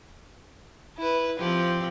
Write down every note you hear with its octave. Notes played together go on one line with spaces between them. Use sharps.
E4 B4
F3 C4 G4